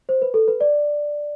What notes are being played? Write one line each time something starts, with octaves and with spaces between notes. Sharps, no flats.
C5
B4
A4
B4
D5